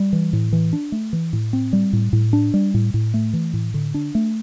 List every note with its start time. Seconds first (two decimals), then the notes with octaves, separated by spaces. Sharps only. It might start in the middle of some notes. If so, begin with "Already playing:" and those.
Already playing: G3
0.13 E3
0.33 A2
0.53 E3
0.73 D4
0.92 A3
1.13 E3
1.33 A2
1.53 C4
1.73 G3
1.93 A2
2.13 A2
2.33 D4
2.54 G3
2.74 A2
2.94 A2
3.14 A3
3.33 E3
3.53 A2
3.74 D3
3.94 D4
4.15 A3